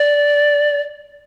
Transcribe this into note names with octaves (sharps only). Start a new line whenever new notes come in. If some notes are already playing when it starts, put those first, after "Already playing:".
Already playing: D5